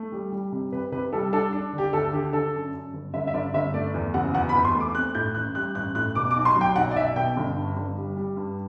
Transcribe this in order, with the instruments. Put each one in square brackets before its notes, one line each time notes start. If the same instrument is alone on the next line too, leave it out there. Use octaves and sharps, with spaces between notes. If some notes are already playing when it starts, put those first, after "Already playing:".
Already playing: [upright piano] A3
G3
G3
C3
C3 B4
C3 B4
G3 A4
D4 A4
D4
D3
G4
D2 A4
D3 G4
D3 A4
F#2
F#2
G1
G1 E5
E5
G1 D5
G1 E5
A3 D5
E2
F#1 F#5
E2 F#5
B5
E2
C6
A3
D6
C4 F#6
A2 G6
A1 F#6
G3 F#6
A1 F#6
A2 F#6
B2 D6
D6
B1
C6
F#3
G5
B1 F#5
D5
B1 E5
B2 G5
G1
G2
G1
G3
G3
G2